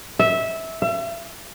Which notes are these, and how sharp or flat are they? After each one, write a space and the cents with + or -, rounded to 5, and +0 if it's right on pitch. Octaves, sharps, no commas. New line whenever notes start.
E5 -15
E5 +40